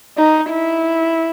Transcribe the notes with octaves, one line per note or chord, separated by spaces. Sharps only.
D#4
E4